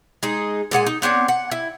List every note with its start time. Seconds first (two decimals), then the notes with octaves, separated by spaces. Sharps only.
0.23 G#3 D#4 G#4
0.71 A#2 G#3 F#5 G#5
0.86 D#4
1.02 B3 C4 D4 C#5
1.28 F#5
1.51 E4